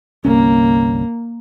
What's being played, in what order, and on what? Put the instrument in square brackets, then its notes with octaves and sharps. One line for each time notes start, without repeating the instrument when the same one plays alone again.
[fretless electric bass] G1 C2 C#4 [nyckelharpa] A#3